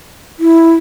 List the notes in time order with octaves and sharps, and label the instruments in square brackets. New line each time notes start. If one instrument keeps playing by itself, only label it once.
[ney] E4